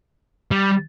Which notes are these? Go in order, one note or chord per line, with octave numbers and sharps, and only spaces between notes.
G3